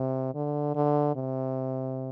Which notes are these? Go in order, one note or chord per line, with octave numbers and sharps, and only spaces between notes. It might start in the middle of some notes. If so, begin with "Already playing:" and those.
Already playing: C3
D3
D3
C3